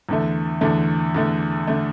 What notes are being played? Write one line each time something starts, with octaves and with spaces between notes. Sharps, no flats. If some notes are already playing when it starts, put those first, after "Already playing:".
E2 D3 A3
E2 D3 A3
E2 D3 A3
D3 A3